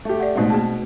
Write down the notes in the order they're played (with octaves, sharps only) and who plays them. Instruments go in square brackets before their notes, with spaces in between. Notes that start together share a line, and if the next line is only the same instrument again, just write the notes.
[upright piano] A3 G4
[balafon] D5 F#5
[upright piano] B2 C4 [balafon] G#3 A3 D#4
[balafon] A#3 G#4 A5